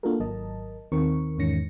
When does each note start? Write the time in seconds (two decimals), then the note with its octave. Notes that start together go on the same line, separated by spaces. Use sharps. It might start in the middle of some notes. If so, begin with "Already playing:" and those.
0.03 A#3 D4 F4 F#4 A4 A#4
0.20 G#1 F#3 A#4 D#5 A5
0.92 D#2 D#3 C4 A#4 C#6
1.38 E2 G#2 D#3 C#4 A#6 C#7